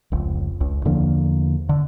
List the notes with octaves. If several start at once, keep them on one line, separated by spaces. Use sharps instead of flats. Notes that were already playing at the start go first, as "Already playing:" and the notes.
F1 C#2
C#2
E2 D3 F3 A#3
D3